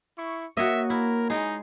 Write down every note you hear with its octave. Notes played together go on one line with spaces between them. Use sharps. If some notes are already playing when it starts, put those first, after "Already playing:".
E4 C#6
A#3 F#4 C#5 D#5 E5
E4 A#4
G#3 D#4